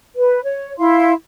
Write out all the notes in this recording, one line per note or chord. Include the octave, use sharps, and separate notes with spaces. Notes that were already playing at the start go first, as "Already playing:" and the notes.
B4
C#5
E4 F5 C6